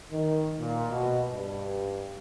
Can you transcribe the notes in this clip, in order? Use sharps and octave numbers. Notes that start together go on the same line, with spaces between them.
D#3
A#2
B2
G2